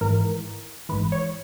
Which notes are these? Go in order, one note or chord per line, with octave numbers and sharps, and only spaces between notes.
G#1 G#2 E3 A#4
G#1 G#2 E3 B4
C#5